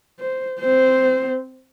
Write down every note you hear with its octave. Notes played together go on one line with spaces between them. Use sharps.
C5
C4 C5